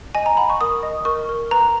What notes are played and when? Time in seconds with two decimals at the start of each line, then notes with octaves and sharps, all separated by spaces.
0.15 D#5 G#5
0.26 A#5
0.37 F#5 B5
0.50 C#6
0.61 A#4 D#6
0.83 D#5
1.05 A#4 C#6
1.29 A#4
1.51 B4 A#5